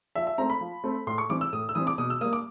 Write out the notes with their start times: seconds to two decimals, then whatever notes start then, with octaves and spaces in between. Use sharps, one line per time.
0.15 F3 E5
0.27 E5
0.38 A3 C4 A#5
0.50 B5
0.61 F3
0.84 A3 C4
1.07 A2 C6
1.18 C#6
1.30 E3 G3 C4 D6
1.41 E6
1.53 A2 D#6
1.69 E6
1.75 E3 G3 C4 D#6
1.87 D6
1.98 B2 D#6
2.10 E6
2.21 G3 A#3 D#6
2.33 D6